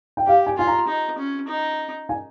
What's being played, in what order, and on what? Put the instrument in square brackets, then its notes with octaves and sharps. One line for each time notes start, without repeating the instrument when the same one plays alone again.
[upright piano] G5
[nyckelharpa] G4 [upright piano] F5
[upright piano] G#5
[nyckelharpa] F4 [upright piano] G#5
[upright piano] A#5
[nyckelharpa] D#4
C#4
D#4
[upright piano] G#5